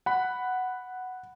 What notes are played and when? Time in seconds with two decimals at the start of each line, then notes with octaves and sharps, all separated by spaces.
0.06 F#5 B5